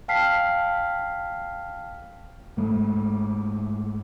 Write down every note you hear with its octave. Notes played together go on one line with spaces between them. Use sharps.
F5 G5 A5 F6 B6 C7
G#2 G#3 A3